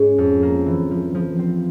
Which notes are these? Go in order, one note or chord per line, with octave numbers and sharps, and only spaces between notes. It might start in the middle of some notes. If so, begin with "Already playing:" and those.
Already playing: G#2 C#4
F2
A#3
E3
F3
F3
C4